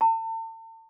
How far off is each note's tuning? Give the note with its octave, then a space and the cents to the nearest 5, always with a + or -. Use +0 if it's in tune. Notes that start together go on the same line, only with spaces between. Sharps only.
A5 +40